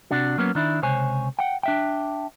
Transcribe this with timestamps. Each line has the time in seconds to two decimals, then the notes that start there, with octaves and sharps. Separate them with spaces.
0.11 C3 D4 F#4
0.38 F#3 A#3 B3 C#4
0.55 D#3 D4 E4
0.82 C#2 C3 C5 C#5 G#5
1.39 F#5 G5
1.63 D4 E5 G5